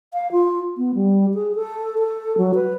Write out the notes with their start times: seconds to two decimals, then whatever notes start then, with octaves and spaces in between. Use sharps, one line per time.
0.13 F5
0.32 F4
0.77 B3
0.95 G3
1.34 G#4
1.55 A4
1.98 A4
2.38 F#3
2.54 B4